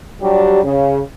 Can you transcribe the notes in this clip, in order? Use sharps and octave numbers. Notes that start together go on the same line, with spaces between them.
F#3 G3 D4 G4
C#3